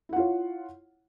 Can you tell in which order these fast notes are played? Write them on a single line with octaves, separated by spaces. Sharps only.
E4 F#5 F4 C#5